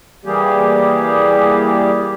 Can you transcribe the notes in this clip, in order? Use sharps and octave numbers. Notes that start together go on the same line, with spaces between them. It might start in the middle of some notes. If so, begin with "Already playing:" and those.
E3 G3 A#3 G4 G#4